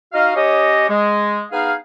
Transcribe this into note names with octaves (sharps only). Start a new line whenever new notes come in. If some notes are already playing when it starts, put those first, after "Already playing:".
D#4 F#4 D#5 F5
C#4 G4 C#5 D#5
G#3
B3 D#4 G#4 F5